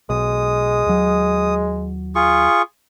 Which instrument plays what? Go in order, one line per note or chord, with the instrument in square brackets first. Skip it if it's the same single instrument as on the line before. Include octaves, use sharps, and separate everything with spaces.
[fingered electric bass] B1 [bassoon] G#3 [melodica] D#6
[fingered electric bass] D#2 F#3
[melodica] F4 G#4 C#6